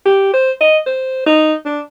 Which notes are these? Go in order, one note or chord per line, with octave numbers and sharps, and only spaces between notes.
G4
C5
D#5
C5
D#4
D4